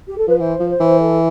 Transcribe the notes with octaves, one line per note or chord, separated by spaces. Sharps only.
G4
A4
F3 B4
E3 C5
F3
C5
E3
A4